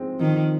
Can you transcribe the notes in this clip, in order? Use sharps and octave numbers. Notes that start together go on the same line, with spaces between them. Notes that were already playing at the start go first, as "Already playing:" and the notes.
Already playing: G#2 F3 G#3 C4
D#3 F3